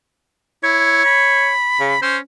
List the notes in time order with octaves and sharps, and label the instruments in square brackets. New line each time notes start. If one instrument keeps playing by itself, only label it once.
[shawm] E4 [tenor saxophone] C#5
[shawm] B5
[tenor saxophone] C#3
[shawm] C#4 [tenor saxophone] C5